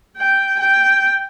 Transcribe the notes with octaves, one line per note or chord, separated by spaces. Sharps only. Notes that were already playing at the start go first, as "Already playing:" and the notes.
G5
G5